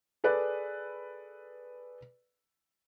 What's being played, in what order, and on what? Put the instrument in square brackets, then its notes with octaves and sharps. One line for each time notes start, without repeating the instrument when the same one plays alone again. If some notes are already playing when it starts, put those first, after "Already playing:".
[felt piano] G#4 A4 B4 D5